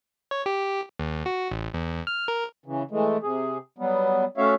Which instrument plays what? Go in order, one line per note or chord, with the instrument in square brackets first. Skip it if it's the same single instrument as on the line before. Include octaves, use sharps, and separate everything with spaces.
[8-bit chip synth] C#5
G4
D#2
F#4
A1
E2
F6
A#4
[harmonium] C#3 E3
E3 G#3 A3
C3 G#4
F#3 G3 B3
A3 C#4 F#4 C#5 E5 F5